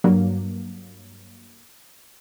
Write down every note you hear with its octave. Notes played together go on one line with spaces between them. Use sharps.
G2 F#3 A#3